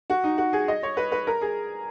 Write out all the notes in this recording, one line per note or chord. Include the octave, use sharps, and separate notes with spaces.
F#4
D#4
F#4
G#4
D#5
C#5
B4
B4
A#4
G#4